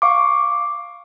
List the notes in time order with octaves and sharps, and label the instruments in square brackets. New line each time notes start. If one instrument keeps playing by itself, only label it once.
[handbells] F5 C#6 D6